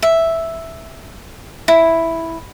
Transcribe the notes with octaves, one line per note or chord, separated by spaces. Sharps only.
E5
E4